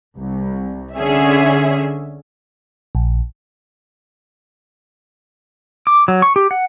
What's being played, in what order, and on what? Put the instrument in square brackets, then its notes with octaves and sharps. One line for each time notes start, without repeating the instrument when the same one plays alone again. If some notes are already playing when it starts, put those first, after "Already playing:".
[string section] C2
D3 C#4 G#4 E5
[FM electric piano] A#1
[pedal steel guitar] D6
F#3
C#6
G4
F#5